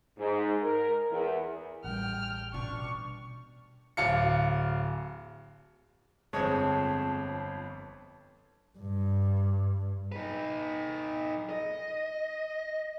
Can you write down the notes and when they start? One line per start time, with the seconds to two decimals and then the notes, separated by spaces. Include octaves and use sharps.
0.17 G#2
0.61 A#4
1.10 E2
1.84 A1 G3 G5 F6
2.53 B2 C#4 D4 C#6
3.97 D1 F5 C#7
6.33 G1 F2 G#3 C4 C#5 A5
8.79 G2
10.12 D#4 B4
11.50 D#5